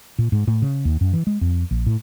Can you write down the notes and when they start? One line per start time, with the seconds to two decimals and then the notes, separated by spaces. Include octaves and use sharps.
0.19 A#2
0.32 G#2
0.47 A2
0.62 C#3
0.85 D#2
1.01 F#2
1.13 E3
1.27 G#3
1.41 F2
1.71 A#1
1.86 A2